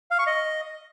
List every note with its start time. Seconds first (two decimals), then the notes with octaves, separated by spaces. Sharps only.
0.11 F5
0.19 C#6
0.27 D#5